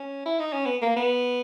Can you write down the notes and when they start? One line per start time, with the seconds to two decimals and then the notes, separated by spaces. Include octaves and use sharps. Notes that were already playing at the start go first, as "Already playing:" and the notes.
Already playing: C#4
0.26 E4
0.39 D#4
0.53 C#4
0.66 B3
0.82 A#3
0.96 B3